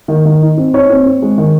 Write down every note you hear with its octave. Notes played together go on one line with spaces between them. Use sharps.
D#3
D#3
D#4
C4
D#4 C#5
C4
C4
G#3
D#3